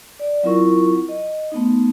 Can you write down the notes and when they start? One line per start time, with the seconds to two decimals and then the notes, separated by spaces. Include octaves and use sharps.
0.19 D5
0.43 F#3 C4 E4 F4 A#4 C#6
1.09 D#5
1.52 A3 B3 D#4